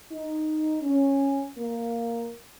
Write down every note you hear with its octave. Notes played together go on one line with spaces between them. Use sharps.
D#4
C#4
A#3